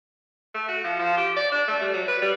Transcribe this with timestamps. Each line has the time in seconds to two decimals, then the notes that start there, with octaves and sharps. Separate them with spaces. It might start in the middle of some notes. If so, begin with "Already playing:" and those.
0.54 A3
0.68 F#4
0.84 F3
0.99 F3
1.17 G4
1.36 D5
1.52 D4
1.68 A3
1.81 G3
1.94 F#3
2.08 B4
2.22 G3